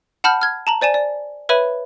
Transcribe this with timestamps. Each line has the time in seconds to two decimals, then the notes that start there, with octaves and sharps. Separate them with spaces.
0.24 F#5 A5 B5 F6 G6
0.41 F6 G#6
0.67 A5 A#5 F#7
0.81 C5 D5 G#5 E7
0.94 D5
1.49 B4 C#5 E5 B5 D#7